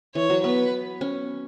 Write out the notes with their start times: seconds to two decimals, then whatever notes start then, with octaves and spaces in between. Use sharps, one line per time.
0.15 E3 C#5
0.30 F#3
0.44 B3 B4
1.01 C#4